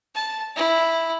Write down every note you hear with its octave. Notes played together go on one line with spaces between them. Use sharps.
A5
E4